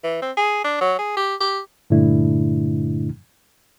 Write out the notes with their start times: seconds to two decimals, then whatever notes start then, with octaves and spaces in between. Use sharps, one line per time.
0.04 E3
0.22 C4
0.37 G#4
0.64 D4
0.81 F#3
0.99 G#4
1.17 G4
1.40 G4
1.90 G2 A#2 D3 A3 D4 E4